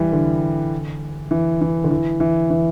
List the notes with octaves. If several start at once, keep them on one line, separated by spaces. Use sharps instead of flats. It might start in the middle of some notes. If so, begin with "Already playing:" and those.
Already playing: E3 G3
D3
E3
E3
D3
E3
E3
E3